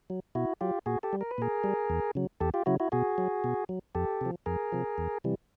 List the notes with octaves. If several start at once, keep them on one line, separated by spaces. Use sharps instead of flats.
F#3
B2 E4 F#4
F#3 F4 G4
A#2 F#4 G#4
G4 A4
G3
A#4
B4
A#2 G#4 A#4
G3
E2
C#3 F#3
E2 G4 A4
F4 G4
C#3 F#3 E4 F#4
E4 F#4
B2 F#4 G#4
F#3
B2
F#3
F2 G4 A4
C3 F3
F2 G#4 A#4
C3 F3
E2
C3 E3 G3